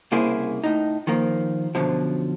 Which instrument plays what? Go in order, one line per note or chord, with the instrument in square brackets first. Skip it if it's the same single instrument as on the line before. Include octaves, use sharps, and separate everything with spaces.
[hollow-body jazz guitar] C2 C#3 A#3 E4 G#4 C5
A2 D#4
D#3 F3 A#3
F#2 B2 D3 F3